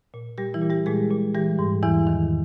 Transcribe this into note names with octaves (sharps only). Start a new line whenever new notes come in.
A#2
A#2 G3 G4
E3 E4
A#2
G3 G4
A#2 G#3 G#4
A#2
E3 G3 G4
G#2
E2 E3 E4
D#3